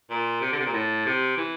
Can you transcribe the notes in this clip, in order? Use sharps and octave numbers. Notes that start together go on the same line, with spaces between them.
A#2
C3
D3
C3
A#2
A2
C3
E3